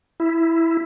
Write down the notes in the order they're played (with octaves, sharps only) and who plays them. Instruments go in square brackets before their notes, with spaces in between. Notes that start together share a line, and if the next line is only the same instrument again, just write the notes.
[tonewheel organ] E4